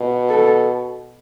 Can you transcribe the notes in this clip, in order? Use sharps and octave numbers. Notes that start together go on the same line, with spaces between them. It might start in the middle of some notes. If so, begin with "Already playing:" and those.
Already playing: B2
A4